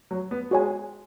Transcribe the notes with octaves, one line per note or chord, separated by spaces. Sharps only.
F#3
B3
G#3 F#4 C#5 G#5